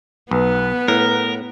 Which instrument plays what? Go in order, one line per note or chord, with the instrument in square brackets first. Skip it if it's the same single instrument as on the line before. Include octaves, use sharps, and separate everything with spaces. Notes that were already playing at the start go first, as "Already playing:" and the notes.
[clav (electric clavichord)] B1 [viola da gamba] B3 [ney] B4
[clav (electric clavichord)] A2 [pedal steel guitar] A#4